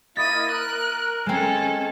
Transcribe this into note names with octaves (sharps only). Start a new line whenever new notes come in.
A#3 E4 D#5 D#6 A6 B6 D#7
A#4 F#6
G#3 C4 C#4 A4